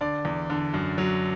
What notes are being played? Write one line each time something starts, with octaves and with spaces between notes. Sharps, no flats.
D3 D5
E2
D3
F#2
F#3